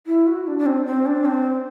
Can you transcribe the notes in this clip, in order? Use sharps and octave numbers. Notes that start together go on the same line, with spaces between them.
E4
F#4
D4
D4
C4
C4
D4
C4